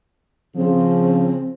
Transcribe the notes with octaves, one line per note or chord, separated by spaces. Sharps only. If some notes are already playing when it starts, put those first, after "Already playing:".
C#3 F3 C4